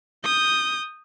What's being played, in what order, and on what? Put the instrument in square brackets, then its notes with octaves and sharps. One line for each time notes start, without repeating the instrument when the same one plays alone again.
[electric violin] D#6 G6